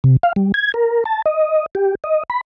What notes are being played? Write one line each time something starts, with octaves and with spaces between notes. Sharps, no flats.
C3
F5
G3
G#6
A#4
A5
D#5
G4
D#5
B5